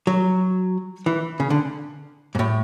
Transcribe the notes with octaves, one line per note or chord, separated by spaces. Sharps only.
F#3
E3
C#3
D3
G#2
A2